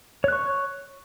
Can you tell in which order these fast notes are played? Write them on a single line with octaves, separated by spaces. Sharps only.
C#5 F#6 C#6